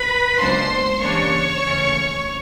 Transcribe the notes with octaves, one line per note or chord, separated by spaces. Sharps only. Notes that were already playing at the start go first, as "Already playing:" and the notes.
Already playing: B4 B5
C#2 B2 F#3 A#3 D4 C5 C6
C#3 E3 G3 A#3 D4 C#5 C#6
D#2 C#3 E3 A3 C#4